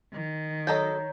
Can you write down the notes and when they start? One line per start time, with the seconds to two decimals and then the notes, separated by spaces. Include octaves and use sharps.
0.13 D#3
0.67 F#3 A4 C#5 D#5 A#5 G6